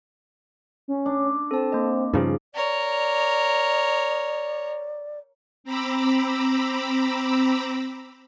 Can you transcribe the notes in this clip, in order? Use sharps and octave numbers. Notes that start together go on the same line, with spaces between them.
C#4
D4
C4 A4 A5
A#3 D#5
G2 C#3 F3 D#4 G#4
A#4 C#5 D5
C4 A#5 B5 D6 E6